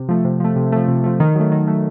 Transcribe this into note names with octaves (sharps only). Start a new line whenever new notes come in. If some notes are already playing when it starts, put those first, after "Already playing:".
Already playing: C3
F3 A3
C3
F3 A3
C3
F3 A3
C3
F3 A3
D#3
F#3 A3
D#3
F#3 A3